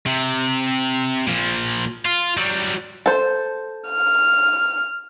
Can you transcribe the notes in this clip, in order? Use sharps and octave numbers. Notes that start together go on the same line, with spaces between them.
C3
A#2 F3
F4
F#3 G3
A4 C5
F6